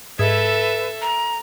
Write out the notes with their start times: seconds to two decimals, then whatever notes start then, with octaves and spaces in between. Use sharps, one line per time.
0.19 G#2 A4 B4 E5 G#6
1.02 A#5